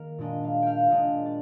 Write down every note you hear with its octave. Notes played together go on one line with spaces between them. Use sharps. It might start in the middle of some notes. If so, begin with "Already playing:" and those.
Already playing: D#3 A#3 A#4
A#2 G#3 D4 D#5
F5
F5 G5
A#2 G#3 D4 D#5
D5